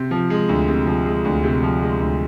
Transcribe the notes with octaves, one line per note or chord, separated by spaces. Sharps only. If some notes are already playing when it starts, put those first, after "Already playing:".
Already playing: C3
F3
G#3
D2
C3
F3
G#3
D2
C3
F3
G#3
D2